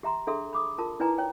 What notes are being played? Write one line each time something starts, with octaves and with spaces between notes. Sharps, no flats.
G4 E5 A#5 C6
D4 G#4 A4 E5 C6
B5 D6 D#6
F4 A#4 A5
D#4 E4 B4 D5 G#5 A#5
C#5 G5